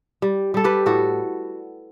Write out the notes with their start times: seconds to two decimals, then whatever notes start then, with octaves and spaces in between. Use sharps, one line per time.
0.22 G3
0.54 G3 A4
0.64 G4 B4
0.86 A2 F#4 A4